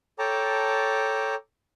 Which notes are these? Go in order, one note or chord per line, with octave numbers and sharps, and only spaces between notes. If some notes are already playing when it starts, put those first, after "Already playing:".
A4 C#5 G5 A5 A#5 D6